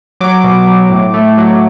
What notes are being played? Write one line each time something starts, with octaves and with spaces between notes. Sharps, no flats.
F#3 D6
B2
F#3
A2
A3
F#3